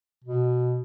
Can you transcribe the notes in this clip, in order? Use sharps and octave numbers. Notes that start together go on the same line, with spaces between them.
B2